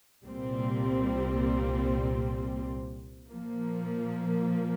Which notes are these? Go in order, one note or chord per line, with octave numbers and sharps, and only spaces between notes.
C2 A#2 G3 C4
A#2 F3 A#3